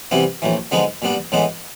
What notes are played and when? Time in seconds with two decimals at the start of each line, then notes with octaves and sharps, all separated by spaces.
0.11 C3 E3 G3 B3 E4
0.42 A#1 A2 E3
0.71 D3 F3 G#3 B3 D#4
1.02 A#2 G3 B3 D4
1.32 A2 E3 G#3 B3